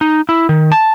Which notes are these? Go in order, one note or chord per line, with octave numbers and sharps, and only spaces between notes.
D#4
E4
D#3
A5